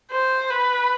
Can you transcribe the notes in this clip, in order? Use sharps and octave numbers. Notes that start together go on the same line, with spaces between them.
C5
B4